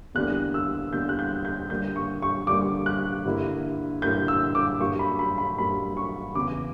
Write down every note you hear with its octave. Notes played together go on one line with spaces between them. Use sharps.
E2 D3 G3 A#3 F#6
E6
E2 D3 G3 A#3 G6
F#6
G6
G6
D3 G3 A#3 G6
C#6
C#6
D3 G3 A#3 D6
F#6
G2 D3 A#3 E4
G2 D3 A#3 E4 G6
E6
D6
G2 F#3 A#3 C#6
B5
B5
B5
G2 F#3 A#3 B5
C#6
E2 C#3 E3 D6